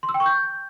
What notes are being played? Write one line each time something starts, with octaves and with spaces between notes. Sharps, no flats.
C6
E6
G5
C#6
G6